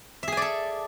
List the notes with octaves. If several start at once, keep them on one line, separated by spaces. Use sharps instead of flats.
G#4 A4 D5 E5 G#5